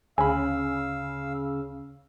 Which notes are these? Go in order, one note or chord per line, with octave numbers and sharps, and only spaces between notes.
D2 C#3 F5 G#5 B5 E6